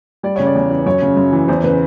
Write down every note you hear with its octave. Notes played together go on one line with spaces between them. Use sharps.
G3 D5
C#3 C#5
D5
E2
E3
F#2 C#5
C#3
F#2
E3
E2 C5
C#3 B4